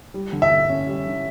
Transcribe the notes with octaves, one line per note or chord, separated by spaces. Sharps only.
G3
D3
E5
D3
C#4
G3
D3